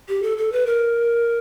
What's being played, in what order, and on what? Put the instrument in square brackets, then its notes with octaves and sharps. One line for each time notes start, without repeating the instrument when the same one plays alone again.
[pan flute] G4
A4
A4
B4
A#4